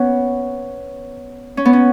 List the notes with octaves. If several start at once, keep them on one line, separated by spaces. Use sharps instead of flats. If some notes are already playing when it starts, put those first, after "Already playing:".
Already playing: B3 C#4
C#4
B3
C#4